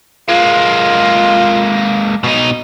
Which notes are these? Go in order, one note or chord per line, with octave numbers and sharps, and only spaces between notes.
G#3 A#3 F4
B2 D#4